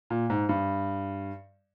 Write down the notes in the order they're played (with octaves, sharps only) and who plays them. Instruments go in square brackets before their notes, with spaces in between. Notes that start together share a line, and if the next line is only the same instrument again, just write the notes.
[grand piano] A#2
G#2
G2